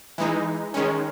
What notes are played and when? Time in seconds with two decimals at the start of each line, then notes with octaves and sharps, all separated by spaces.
0.18 E3 G#3 D#4
0.74 D#3 G#3 C#4